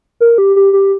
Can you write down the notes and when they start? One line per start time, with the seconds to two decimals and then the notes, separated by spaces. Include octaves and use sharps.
0.20 A#4
0.38 G4
0.56 G4
0.73 G4